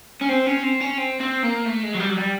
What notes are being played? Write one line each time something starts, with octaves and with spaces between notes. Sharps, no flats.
C#4
C4
C#4
C4
C#4
C4
C4
A#3
A3
G#3
F#3
G3
F#3
G3